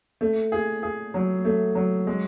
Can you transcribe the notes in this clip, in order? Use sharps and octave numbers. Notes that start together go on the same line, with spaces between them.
A3
G#4
G#4
F#3
A3
F#3
G#3